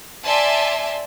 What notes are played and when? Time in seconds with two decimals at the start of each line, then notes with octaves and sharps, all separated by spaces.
0.24 D5 E5 G#5 A5 C6